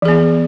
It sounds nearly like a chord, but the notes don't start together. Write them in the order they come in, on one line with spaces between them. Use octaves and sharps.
E3 G#4 B3